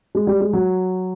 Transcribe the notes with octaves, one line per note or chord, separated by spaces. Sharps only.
G#3
G3
G#3
F#3